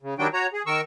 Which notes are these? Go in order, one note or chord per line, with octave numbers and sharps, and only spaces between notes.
C#3
D#3 F#3 G3 D4 F#4 G5
F#4 C#5 A#5
G#4
D#3 A#4 C#6 E6